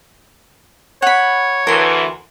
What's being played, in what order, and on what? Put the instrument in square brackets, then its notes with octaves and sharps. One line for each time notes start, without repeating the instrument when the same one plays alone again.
[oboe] C#5 [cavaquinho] F#5 B5
[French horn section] D2 E3 [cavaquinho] A#4 C6